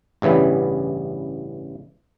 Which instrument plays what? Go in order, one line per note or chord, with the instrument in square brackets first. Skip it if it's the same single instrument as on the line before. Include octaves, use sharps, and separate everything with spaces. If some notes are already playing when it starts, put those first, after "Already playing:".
[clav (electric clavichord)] A1 G2 C#3 E3 B3